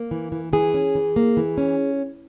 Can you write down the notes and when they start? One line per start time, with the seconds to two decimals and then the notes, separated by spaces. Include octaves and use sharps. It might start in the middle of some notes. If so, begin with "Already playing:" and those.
Already playing: A#3 A#4
0.11 E3
0.32 E3
0.53 E3 G#4
0.74 C#4
0.95 E3
1.16 A#3
1.37 E3
1.58 C#4